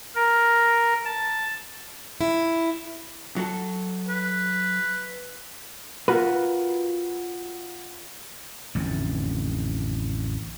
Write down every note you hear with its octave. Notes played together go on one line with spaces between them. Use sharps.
A#4
A5
E4
F#3 F#4 A4
B4
F4 F#4 A#4 B4
A1 F2 D3